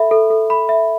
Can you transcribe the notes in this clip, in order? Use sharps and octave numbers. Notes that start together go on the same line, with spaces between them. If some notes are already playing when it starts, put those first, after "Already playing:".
Already playing: A4 E5 B5
A4
A4
B5
E5